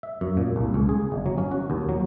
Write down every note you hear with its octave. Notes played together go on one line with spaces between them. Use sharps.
E5
F#2
A#2
C2
C#2
G#4
G1
F#3
C#4
F#4
D#2
F#3